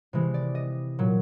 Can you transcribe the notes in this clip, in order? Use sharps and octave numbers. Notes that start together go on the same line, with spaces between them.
C3 E3 G#3
D5
D#5
A#2 F#3